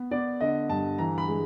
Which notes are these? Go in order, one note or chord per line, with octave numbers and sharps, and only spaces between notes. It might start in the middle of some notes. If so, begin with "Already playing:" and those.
Already playing: B3
B3 D5
D3 D#5
G2 A5
E3 A#5
B5
G#3